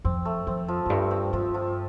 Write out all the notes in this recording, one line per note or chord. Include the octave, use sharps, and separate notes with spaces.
F2 C4
A3
F2 C4
F3
F2
G2 A3
C4
G2 F3
F3